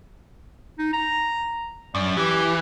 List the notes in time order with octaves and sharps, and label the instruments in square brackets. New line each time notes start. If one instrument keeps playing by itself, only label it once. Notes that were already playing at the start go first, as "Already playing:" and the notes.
[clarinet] D#4
A#5
[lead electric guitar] F#2 [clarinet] D5
[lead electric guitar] E3 [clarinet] G4